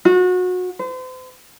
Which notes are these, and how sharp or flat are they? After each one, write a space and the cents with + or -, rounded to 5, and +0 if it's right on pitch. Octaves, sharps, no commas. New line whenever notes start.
F#4 -30
C5 -40